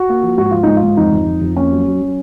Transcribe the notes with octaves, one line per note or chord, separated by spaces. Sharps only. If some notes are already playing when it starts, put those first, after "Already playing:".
Already playing: F#4
A#3
F3
G#2 F#4
F3 F4
G#2 D#4
F4
G#2
F2 D#4
F2
F2
F2
A#3 C#4
F#3
F#3
F#3